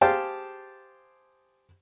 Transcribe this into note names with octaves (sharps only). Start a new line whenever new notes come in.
G4 G#4 C5 F5 G5 A5